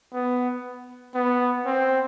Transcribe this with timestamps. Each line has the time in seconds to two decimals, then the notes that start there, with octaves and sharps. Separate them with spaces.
0.13 B3
1.15 B3
1.65 C4